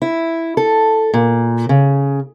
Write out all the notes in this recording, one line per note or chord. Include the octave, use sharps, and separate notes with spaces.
E4
A4
A#2
C#3